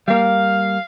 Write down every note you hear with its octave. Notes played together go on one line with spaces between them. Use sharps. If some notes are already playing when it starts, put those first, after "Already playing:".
G3 A#3 F5